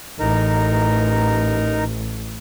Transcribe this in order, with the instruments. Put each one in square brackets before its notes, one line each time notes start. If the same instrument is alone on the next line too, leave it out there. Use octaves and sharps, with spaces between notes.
[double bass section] A1 [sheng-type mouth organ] D#4 A#4